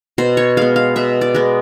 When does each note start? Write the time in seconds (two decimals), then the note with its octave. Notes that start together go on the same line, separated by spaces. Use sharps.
0.18 B2 C5
0.37 C#5
0.57 G#3 B3 F5
0.76 F5
0.96 B2 E5
1.21 D5
1.35 G#3 B3